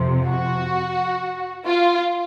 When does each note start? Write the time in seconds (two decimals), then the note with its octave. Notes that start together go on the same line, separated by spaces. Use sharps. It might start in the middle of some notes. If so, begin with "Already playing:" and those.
Already playing: F2 C3 F3
0.25 F#4
1.66 F4